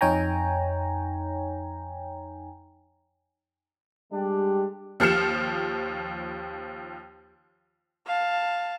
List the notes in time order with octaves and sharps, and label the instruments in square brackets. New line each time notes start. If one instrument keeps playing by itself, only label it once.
[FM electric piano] F2 D#4 C#5 G5 G#5 A#5
[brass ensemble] G3 G#3 D4 G4
[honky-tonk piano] D#2 F3 G4 F6 C#7 E7
[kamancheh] F5 A5